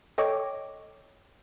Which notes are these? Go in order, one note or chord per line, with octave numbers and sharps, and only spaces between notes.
A4 C#5 D#5 G5 C#6 D6